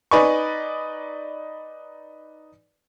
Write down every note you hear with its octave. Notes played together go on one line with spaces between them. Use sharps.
D#4 B4 D5 G#5 B5 C#6